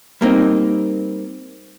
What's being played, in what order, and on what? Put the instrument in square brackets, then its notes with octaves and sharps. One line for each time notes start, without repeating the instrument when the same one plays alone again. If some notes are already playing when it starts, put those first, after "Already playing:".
[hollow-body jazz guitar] G3 A#3 C4 D#4